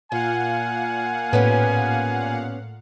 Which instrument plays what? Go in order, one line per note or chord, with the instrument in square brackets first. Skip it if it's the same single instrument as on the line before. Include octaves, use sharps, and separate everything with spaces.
[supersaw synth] A#2 F5 F#5 [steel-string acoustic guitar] F4 [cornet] G#5
[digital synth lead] A2 [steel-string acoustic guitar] B3 C#4 G4